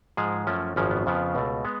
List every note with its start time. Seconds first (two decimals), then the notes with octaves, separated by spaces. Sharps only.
0.17 G#2 F3 G#3 G#4
0.47 F#2 F3 A3 C#4
0.76 G#1 F#2 C#3 F3 C#4
0.91 B3
1.06 F2 C#3 F3 B3
1.35 C#2 B2 A3
1.65 G#3 B3